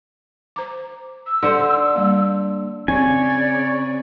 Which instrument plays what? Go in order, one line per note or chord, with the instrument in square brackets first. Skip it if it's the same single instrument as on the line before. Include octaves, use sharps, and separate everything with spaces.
[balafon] C5 A#5 D6
[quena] E6
[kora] D3 C5 [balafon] A4
[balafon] G3 A#3
[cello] C#3 D5 [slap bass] C4 [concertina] C#5 [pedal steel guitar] G#5